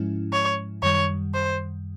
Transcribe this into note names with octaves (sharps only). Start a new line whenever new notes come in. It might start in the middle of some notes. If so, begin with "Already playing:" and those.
Already playing: G#2 F3 G#3 C#4 E4
C#5
F#2 D#3 G3 C#5
C5